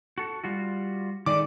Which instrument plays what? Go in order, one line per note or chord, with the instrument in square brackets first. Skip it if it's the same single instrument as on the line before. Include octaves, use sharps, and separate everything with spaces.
[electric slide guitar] F#4 A4
G3 F4 F#4
[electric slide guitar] D#3 G#3 A3 [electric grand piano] D5 D6